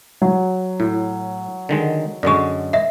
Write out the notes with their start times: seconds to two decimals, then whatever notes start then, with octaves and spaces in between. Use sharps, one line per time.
0.22 F#3
0.80 A2 E4
1.69 D3 D#3 G#3
2.23 F#2 D3 G#3 D5 C#6
2.73 D#5 E5